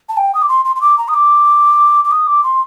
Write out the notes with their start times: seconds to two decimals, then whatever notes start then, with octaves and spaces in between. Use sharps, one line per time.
0.09 A5
0.17 G5
0.35 D#6
0.42 D6
0.49 C6
0.65 C6
0.76 C6
0.81 D6
0.98 A#5
1.08 D#6
1.14 D6
2.05 D6
2.11 D#6
2.27 D6
2.44 C6